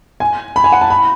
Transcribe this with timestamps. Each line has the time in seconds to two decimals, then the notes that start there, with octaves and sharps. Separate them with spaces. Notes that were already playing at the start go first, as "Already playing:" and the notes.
0.20 G#5
0.56 B5
0.64 G#5
0.72 F#5
0.81 A5
0.90 B5